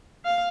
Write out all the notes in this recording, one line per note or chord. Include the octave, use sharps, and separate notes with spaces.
F5